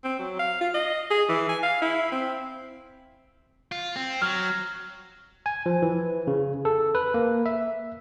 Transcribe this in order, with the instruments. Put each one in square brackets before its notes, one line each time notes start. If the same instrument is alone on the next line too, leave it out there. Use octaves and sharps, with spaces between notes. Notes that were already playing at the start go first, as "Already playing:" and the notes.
[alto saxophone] C4
F#3
F5
F4
D#5
G#4
E3
G#5
F5
E4
C4
[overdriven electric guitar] F4
C4
[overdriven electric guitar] F#3 [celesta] F6
[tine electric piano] G#5
F3
E3
C#3
A4
B4
A#3
E5